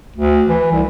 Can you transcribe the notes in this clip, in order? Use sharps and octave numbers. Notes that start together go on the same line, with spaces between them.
D2
E3
C2